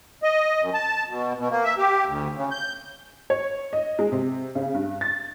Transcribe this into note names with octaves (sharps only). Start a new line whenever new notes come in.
D#5
F#2
A5
B2
B2
A#3
E5
G4
D2
C#3
G6
C#5
D#5
G#3
C3
C#3
G2
A6